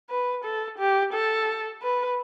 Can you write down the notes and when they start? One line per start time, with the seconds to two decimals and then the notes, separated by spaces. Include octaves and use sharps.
0.10 B4
0.44 A4
0.78 G4
1.13 A4
1.82 B4